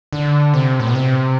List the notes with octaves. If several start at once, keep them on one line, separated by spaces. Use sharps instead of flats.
D3
C3
A2
B2
C3